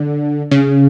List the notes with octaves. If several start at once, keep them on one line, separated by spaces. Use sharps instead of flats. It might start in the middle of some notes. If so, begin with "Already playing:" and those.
Already playing: D3
C#3